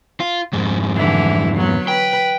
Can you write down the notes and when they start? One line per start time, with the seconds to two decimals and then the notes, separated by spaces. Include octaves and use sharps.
0.20 F4
0.53 F2 G#2
0.96 D3 E3 E4
1.56 F#3 B3
1.88 B4 G5